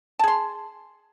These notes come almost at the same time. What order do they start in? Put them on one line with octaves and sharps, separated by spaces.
A5 G#4 C6